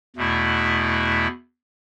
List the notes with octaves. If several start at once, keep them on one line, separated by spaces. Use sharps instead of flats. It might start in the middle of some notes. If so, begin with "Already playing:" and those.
E2 B2 A3 E4